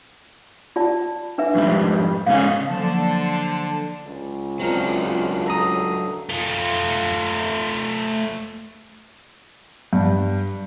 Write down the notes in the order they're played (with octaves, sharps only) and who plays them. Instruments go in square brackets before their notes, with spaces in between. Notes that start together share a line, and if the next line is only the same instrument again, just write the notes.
[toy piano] F4 D5 A5
D4 B4 E5
[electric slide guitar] F2 G#2 G3
[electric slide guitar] G#2 C#3 C#4 [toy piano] F5
[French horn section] D3 [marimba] F3 F#3 A#3 [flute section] C5 A5
[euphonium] C#2
[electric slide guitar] F#3 D4 [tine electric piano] C4 A#4 [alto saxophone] F4
[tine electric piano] A4 A#5 D#6
[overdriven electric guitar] A3 F4
[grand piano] G2